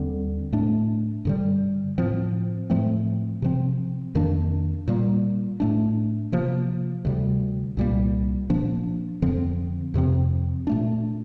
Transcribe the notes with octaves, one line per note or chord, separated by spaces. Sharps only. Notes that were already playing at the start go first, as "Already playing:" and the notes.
Already playing: D#2 D3 G3 C4
A2 A3 D4
G2 D3 G3
A2 F3 C4
A2 F3 A3 C4
C3 F3 C4
F2 D#3 A#3 D4
A#2 G3 A#3
A2 A3 D4
C3 F3 A#3
D2 C3 G3
C2 A#2 G3 A#3
A#2 F3 A#3 D4
F2 D3 F3 C4
F2 C3 F3 C4
A#2 A3 D4